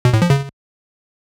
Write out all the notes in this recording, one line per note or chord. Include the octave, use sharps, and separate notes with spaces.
B2
A2
F3
C#3